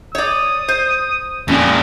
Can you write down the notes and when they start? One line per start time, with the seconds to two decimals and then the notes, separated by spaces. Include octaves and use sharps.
0.15 C#5 D5 D#6
0.68 C5
1.48 F2 A#2 C#4